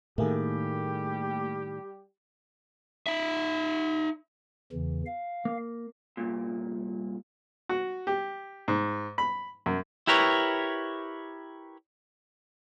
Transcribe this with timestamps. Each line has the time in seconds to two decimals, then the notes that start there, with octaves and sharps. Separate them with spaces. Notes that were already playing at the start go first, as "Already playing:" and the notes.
0.18 A2 D#3 G3 A3 A#3 G4 G#4
3.07 D#4 E5
4.72 E2 C#3 E3
5.06 F5
5.45 A#3
6.17 C2 G2 A#2
7.69 F#4
8.07 G4
8.68 G#2
9.18 B5
9.66 F#2
10.07 E4 G4 A#4 B4 C#5